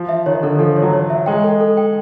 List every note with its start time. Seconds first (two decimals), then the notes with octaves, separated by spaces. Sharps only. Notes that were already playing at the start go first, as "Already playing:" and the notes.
Already playing: F3
0.09 E5
0.26 D#3 C#5
0.43 D3 A4
0.59 F3 A4
0.76 C#5
0.82 F#3
0.93 C#5
1.10 E5
1.26 G#3 G5
1.44 A4
1.61 A4
1.77 G5